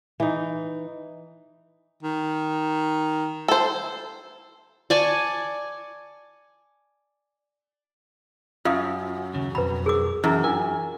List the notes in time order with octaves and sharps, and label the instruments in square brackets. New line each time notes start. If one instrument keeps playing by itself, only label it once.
[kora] E3 D#4
[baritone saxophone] D#3
[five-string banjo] A4 C5
[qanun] D5 G#5 A5 C#6
[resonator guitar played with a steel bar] F#2 [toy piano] F4 F5 D#6
[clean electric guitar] D#2 C#3
[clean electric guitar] B1 F2 [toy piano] B4 A#5 B5
[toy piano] G#4 A#4 D6
[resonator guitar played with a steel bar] F#2 [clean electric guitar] E3 [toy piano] E4 G#4 A#5
[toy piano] D4 F4 A#4 [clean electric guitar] G#5